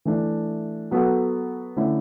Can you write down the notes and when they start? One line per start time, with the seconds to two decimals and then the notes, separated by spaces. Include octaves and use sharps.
0.05 E3 A3 D4
0.91 F#3 B3 F#4 A4
1.77 D3 A3 C#4 E4